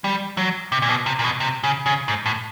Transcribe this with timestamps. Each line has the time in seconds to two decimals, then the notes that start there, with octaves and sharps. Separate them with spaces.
0.04 G3
0.37 F#3
0.72 C3
0.82 A#2
0.89 B2
1.06 C3
1.19 A#2
1.24 B2
1.40 C3
1.64 C#3
1.86 C#3
2.08 G#2
2.26 A2